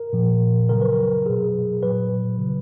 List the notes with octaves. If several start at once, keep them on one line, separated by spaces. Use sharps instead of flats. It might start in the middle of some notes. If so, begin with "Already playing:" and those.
Already playing: A#4
A#2 F3
C#3 F#3 A#4
B4
A#4
B2 F#3 G#4
A#2 F#3 B4
C#3 F#3